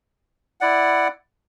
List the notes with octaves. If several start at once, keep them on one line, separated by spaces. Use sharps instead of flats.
E4 D5 F#5